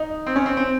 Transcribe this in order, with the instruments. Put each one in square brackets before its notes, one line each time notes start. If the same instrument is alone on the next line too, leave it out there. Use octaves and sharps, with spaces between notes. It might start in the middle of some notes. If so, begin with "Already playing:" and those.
Already playing: [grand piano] D#4
C4
C#4
C4
C4